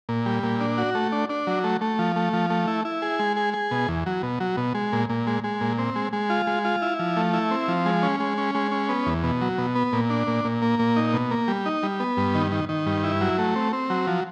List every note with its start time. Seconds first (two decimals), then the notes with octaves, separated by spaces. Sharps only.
0.09 A#2
0.26 G3
0.43 A#2
0.60 D4
0.78 F#4
0.95 A3
1.12 D4
1.29 D4
1.47 F#3
1.64 A3
1.81 A3
1.99 F3
2.16 A3
2.33 F3
2.50 A3
2.67 E4
2.85 E4
3.02 G#4
3.19 G#3
3.37 G#4
3.54 G#4
3.71 B2
3.88 E2
4.06 F#3
4.23 B2
4.40 F#3
4.57 B2
4.75 G#3
4.92 A#2
5.10 A#2
5.27 G#3
5.44 G#3
5.61 A#2
5.78 C4
5.96 G#3
6.13 G#3
6.30 F4
6.47 G#3
6.65 F4
6.82 E4
6.99 F3
7.16 A3
7.34 E4
7.51 C4
7.68 F3
7.86 G#3
8.03 C#4
8.20 G#3
8.38 C#4
8.55 G#3
8.72 C#4
8.89 B3
9.06 E2
9.24 B2
9.41 F#3
9.58 B2
9.75 B3
9.93 A#2
10.10 D4
10.27 A#2
10.45 A#2
10.62 A#3
10.79 A#2
10.96 D#4
11.14 B2
11.31 A#3
11.48 G3
11.66 D#4
11.83 G3
12.00 B3
12.17 G2
12.35 D#3
12.52 D#3
12.69 D#3
12.86 G2
13.04 E4
13.21 F#3
13.38 A3
13.56 C4
13.73 C4
13.90 F#3
14.07 F3